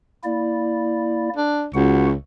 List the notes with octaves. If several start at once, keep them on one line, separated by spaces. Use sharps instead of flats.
A#3 E4 D5
D4
C#2 F#4 F#5